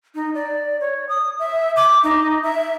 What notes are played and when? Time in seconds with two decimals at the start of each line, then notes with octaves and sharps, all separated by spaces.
0.15 D#4
0.34 D5
0.81 C#5
1.09 D#6
1.39 E5
1.76 D6
2.04 D#4
2.43 E5